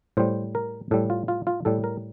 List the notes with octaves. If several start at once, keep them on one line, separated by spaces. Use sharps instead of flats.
A2 G3 C5
A#4
A2 G3 A4
F4
F4
F4
A2 G3 A4
A#4